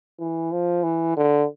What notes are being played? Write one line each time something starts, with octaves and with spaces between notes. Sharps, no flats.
E3
F3
E3
D3